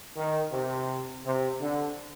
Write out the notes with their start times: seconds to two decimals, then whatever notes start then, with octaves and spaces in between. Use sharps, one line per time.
0.16 D#3
0.52 C3
1.24 C3
1.62 D3